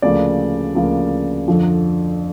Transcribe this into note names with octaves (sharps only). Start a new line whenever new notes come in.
D2 C#3 F3 A#3 D5
D2 C#3 F3 A#3
F2 D3 F3